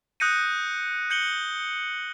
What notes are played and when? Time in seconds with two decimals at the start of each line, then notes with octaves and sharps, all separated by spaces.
0.20 D#6 F#6 G6 A#6 C#7 D#7
1.10 G6 C#7 F#7 G7